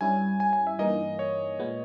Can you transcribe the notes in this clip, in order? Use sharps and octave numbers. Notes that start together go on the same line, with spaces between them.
G2 G3 C#4 E4 G#5
G#5
G#5
E5
G2 E3 A#3 D#4 D#5
C#5
A#2 G#3 B3